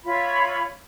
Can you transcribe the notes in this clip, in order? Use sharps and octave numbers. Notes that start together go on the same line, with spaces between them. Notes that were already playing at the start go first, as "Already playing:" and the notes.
F4 C#5 E5 B5